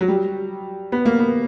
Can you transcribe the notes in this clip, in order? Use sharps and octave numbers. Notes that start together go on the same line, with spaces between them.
F#3
G3
B3
A#3
B3